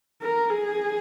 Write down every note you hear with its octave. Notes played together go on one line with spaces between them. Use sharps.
A#4
G#4